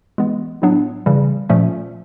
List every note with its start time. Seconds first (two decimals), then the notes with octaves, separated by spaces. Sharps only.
0.18 E3 G#3 B3
0.62 A2 F#3 B3 D4
1.06 C#3 E3 G3
1.49 A#2 F3 A3 C#4